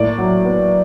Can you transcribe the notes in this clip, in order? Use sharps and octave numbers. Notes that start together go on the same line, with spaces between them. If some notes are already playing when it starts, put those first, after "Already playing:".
Already playing: A2 A#3 D5
F#3
B3